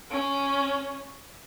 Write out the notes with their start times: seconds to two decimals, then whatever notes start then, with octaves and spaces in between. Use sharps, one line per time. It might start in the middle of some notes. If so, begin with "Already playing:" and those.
0.11 C#4